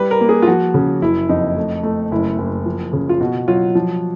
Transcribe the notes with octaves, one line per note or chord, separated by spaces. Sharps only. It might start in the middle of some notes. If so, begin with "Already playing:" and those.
Already playing: G3 B4
A#4
A#3
G#4
F4
F3 F#4
C#3
F#1 E4
F2 D#4
A3
A3
F#1 E4
F#1
F3
C#3
F4
B2 F#4
F#3 F4
F3